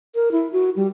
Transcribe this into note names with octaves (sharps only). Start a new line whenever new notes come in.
A#4
E4
F#4
G3